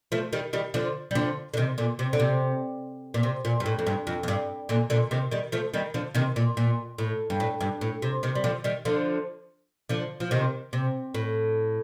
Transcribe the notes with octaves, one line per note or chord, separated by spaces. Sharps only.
F3 A3
D#3 G3
D#3 G3
D3 F3
G3
D3 F3
D3
C3 D#3
A#2 D3
C3
D3
C3
A#2
C3
A#2
G2
A2
F2
G2
F2
F2
G2
A#2 D3
A#2 D3
C3 D#3
D#3 G3
F3 A3
D#3 G3
D3 F3
C3 D#3
A#2
A#2
A2
G2
A2
G2
A2
C3
C3 D#3
G3
D3 F3
D#3 G3
D3 F3
D3 F3
F3
C3 D#3
C3
A2